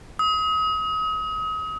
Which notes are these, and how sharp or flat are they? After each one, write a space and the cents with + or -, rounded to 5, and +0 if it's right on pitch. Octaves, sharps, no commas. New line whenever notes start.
D#6 +35